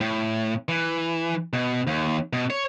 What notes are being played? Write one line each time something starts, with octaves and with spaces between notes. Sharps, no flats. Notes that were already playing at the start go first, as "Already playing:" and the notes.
A2
E3
B2
D#2
B2
C#5